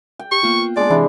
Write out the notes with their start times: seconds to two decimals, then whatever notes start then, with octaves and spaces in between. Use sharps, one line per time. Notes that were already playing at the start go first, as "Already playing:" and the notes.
0.19 G5
0.32 G4 C#6
0.43 A#3 B3 F4
0.77 G#3 D4 D5
0.90 C3 E3 D4 E4